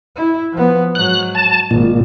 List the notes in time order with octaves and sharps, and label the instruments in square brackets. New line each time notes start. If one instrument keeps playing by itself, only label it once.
[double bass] E4
F3 B3
[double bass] G#2 F#3 [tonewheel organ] F#6
[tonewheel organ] A5
[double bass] G#1 [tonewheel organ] A#2